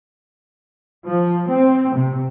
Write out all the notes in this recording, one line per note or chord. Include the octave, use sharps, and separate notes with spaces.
F3
C4
C3